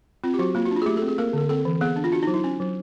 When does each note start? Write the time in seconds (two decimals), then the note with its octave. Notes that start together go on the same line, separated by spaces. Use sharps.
0.24 C4 F4
0.34 G4
0.39 F#3 F#4
0.55 A#3 F4
0.65 F#4
0.71 D4 F4
0.82 G#4
0.86 A3 G4
0.97 A4
1.02 C4
1.08 G#4
1.18 A#3 A#4
1.33 D3 A#4
1.49 C4 A4
1.65 E3
1.81 B3 G#4
1.96 D4
2.04 F4
2.12 D4 F#4
2.23 D#4
2.27 F#3
2.34 E4
2.44 C#4
2.60 F#3